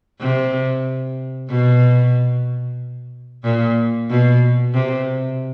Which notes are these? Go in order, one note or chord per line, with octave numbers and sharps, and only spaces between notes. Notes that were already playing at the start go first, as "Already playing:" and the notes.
C3
B2
A#2
B2
C3